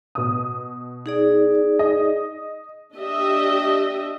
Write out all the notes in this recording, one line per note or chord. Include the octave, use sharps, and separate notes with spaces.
B2 D#6
D#4 G#4 D5
D#5
D4 G4 D#5 E5